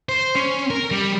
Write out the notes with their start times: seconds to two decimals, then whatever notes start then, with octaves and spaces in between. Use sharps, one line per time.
0.09 C5
0.35 C#4
0.70 A#4
0.91 G3